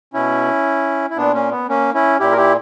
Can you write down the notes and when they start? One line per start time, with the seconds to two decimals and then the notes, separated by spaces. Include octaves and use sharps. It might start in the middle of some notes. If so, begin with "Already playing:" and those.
0.13 B2 C#4 E4
1.10 E4
1.16 A#2 B3 D4
1.34 A#3 C#4
1.51 B3
1.69 A#3 C#4
1.94 C#4 E4
2.20 A#2 E4 G4
2.32 A#4
2.37 E4 G4